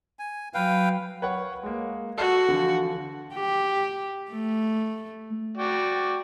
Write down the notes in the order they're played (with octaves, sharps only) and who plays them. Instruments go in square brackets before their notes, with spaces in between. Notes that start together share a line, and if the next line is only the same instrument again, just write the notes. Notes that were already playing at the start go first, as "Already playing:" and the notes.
[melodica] G#5
[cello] F#3 [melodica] B4 F5 G5
[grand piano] B4 C#5 F#5
G#3 A#3
[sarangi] F#4 [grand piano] A4
[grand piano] D3 E3 F3
[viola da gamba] G4
A3
[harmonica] F#4 D5 G5